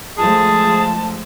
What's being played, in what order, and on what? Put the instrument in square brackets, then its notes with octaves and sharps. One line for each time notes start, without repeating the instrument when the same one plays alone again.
[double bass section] F3 G#3 A3 [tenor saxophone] G#4 [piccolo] A5